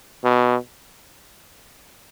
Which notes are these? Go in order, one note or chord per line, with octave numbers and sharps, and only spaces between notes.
B2